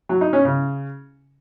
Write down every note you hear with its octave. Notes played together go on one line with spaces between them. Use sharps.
F#3
D#4
C#4
C#3